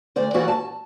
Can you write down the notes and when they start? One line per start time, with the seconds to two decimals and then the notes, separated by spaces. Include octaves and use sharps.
0.16 D2 C5 D5
0.34 E3 G3 A#3 F#4 D5 D#5
0.48 A5